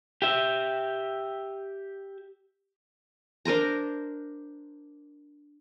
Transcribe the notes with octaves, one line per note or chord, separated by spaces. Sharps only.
G4 E5
D4 A#4 C5 A#5